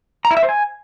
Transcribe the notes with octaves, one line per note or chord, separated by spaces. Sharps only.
A#5
E4
E5
C5
G#5